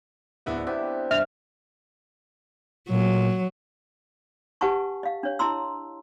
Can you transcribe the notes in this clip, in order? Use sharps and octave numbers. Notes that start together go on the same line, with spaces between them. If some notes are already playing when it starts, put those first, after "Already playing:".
D1 B3 D4 E4 E5
C3 B3 E4 D6
G2 E5 F6
A#2 F#3
G4 B4 F#5 G#5 A5 C#6
D#5 F5
D4 C#5
E4 D#5 A5 A#5 C6 E6